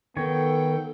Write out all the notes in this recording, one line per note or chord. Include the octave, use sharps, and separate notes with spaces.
D#3 B3 A4 C#5 G5